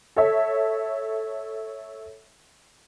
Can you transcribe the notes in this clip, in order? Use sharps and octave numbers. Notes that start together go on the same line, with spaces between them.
A4 C#5 E5